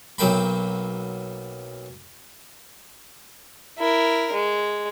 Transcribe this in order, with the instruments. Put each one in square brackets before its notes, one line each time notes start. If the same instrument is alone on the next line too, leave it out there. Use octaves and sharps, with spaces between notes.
[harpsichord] B1 F#3 A#3 G5 B5
[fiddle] E4 A#4
G#3